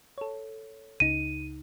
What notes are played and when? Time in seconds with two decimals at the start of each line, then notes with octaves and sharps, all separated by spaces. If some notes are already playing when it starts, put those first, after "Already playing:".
0.18 A4 C#5
1.00 C#2 C#3 D#4 D#7